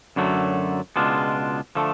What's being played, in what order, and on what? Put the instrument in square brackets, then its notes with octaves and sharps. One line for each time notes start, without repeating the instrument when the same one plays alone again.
[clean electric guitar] F#2 D3 F#3 A3
C#2 B2 G#3 D4 F4
D3 F3 A3